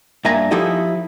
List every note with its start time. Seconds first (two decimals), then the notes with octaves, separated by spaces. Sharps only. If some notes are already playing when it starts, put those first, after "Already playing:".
0.25 G2 A#3 E5 G#5 A#5
0.51 F3 D#4 E4 G4 A4 D#5